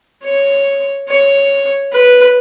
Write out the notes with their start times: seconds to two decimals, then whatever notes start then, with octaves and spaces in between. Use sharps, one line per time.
0.24 C#5
1.09 C#5
1.93 B4